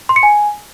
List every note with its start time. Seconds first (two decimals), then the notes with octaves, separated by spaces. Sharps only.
0.09 C6
0.16 C#7
0.23 G#5